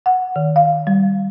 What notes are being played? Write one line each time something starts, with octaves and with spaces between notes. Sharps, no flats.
F#5
D#3
F5
G3